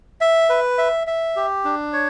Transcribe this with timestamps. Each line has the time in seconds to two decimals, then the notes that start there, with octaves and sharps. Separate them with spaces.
0.21 E5
0.50 B4
0.78 E5
1.07 E5
1.36 G4
1.64 D4
1.93 C#5